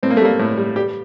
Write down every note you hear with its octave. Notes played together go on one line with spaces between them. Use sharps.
A2 C4
A#3
A3
G3 A#3
A2
G3
G3 G4